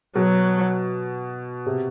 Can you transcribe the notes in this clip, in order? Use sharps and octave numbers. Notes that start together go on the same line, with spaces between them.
B2 F#3
C3